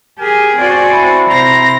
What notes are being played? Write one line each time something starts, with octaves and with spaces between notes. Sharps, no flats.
G4 G#4 A#4 G#5
C4 F#4 D5
E4
C3 C5 A#5 A#6